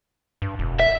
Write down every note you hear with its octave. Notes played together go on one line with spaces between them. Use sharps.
G2
E1
E5